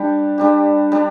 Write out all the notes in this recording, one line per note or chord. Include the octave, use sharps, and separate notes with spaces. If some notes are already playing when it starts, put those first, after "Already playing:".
Already playing: G3 D4 G4
G3 D4 G4
G3 D4